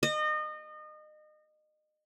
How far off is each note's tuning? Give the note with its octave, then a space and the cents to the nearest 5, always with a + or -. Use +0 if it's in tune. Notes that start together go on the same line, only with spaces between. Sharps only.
D#5 -30